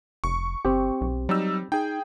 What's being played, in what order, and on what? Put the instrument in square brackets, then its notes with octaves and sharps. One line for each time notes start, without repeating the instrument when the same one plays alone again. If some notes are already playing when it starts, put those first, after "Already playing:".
[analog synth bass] F1 [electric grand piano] C#6
[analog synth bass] G1 [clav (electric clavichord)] C4 G4
[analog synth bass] B1
[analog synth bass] F#3 [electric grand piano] G3 D#4 E6
[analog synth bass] D#4 [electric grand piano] G#4 G5